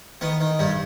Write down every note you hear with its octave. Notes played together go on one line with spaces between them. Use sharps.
D#3 B3
D#3
G2 G3